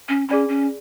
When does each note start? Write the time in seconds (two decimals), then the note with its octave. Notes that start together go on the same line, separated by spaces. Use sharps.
0.09 C#4
0.28 C#4 G#4 D5 G#5 B5
0.49 C#4